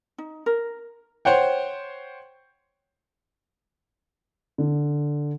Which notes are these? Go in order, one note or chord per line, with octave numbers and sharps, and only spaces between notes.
D#4
A#4
C5 C#5 F#5 G5
D3